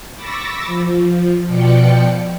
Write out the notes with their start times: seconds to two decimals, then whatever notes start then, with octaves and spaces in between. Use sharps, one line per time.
0.15 B5 C#6 D6 E6 A6 A#6
0.66 F3
1.47 B2 F3 D5 G5 C#7